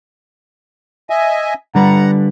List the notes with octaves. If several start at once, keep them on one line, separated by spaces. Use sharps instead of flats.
D#5 E5 G#5
D3 G3 B4 F#5 A#5